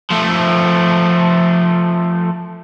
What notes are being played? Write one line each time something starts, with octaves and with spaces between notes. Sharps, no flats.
F3 A3